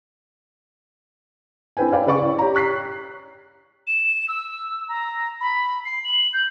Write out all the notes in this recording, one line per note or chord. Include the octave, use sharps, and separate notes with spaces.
C4 D4 E4 B4 G5 G#5
C#4 B4 D5 F5 G5
C#3 B4 D5 C#6
E4
G4 C#5 A#5
C#6 F#6 B6 C7
E7
E6
A#5
B5
C7
F#7
G6